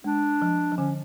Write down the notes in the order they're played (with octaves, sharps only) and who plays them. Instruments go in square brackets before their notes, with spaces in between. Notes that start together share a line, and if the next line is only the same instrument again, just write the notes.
[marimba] G#3 [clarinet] D4
[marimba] F3
F3
[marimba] D3 [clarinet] C#4